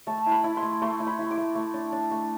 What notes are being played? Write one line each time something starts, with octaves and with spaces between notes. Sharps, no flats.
A3 A5
E4
B5
E4
C6
A3
A3 C6
E4
B5
E4 C6
D6
A3
A3
D4
D4
A3